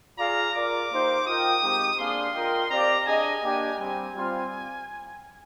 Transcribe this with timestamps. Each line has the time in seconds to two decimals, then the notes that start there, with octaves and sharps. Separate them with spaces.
0.18 F4 G#4 D5 F5 A#5
0.54 F4 A#4 D5 D6
0.91 A#3 D#4 G4 C5 F5
1.26 F4 A#4 D#5 G5 D#6
1.63 G#3 C4 D#4 G4
1.98 A#3 D4 G#4 D5 F5 C6
2.34 F4 A#4 D#5 G5
2.70 C4 G4 D5 F5 A#5
3.07 D4 G#4 D#5 G#5
3.42 A#3 D4 G4
3.79 G3 C4 G4 G#5
4.14 G3 C4 F4